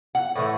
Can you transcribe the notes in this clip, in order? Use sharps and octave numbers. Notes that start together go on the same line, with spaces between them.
F#5
A2 E3 A3